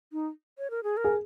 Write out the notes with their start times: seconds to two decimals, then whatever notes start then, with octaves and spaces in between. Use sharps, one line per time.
0.13 D#4
0.58 C#5
0.71 A#4
0.83 G#4
0.97 A#4
1.04 G#4